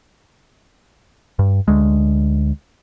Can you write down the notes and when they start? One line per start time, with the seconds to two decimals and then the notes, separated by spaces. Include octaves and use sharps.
1.39 G2
1.68 D2 G#3